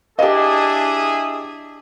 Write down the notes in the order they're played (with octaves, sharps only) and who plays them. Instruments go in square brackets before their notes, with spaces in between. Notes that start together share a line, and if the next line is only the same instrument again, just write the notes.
[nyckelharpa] D4 [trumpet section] E4 G#4 [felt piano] G4 D#5